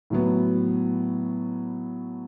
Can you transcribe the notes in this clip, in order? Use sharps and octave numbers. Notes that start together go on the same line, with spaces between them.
A2 F#3 B3